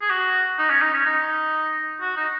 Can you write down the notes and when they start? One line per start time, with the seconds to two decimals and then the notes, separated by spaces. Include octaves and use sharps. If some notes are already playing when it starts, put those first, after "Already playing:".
0.01 G#4
0.10 F#4
0.58 D#4
0.70 C#4
0.82 D#4
0.94 C#4
1.06 D#4
2.01 F#4
2.17 D#4